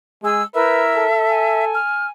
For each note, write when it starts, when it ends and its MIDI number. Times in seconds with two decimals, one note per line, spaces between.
0.23 0.43 56
0.23 0.42 68
0.23 0.42 88
0.54 1.05 64
0.54 1.05 70
0.54 0.83 71
0.54 1.65 76
0.54 1.05 88
0.96 1.78 69
1.29 2.10 80
1.74 2.07 89